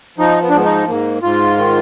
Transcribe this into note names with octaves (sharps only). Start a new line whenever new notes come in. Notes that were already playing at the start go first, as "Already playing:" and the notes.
F3 D#4
B3
D4
G#2 B3
D#4
G#2 A#3
G#2 F4
D#3